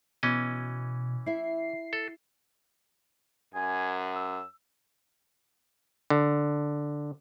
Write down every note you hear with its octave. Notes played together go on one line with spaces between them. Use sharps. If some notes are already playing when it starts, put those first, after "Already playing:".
B2 E3 C#4 D#5
E4 E5 C7
A4
F#2 G#5
E6
D3